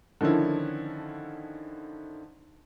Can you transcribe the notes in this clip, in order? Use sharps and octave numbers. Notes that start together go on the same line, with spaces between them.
D3 D#3 F3 C#4 E4